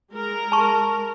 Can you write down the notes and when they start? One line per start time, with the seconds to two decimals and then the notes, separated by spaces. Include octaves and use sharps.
0.13 G#3 A#4
0.52 A5 C#6